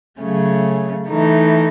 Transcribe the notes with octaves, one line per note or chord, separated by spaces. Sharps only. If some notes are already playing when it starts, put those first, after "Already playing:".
C#3 F#3 A3 C#4 G#4
E3 A3 D#4